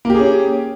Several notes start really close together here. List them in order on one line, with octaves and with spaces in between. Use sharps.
A#3 G4 G#4 C#4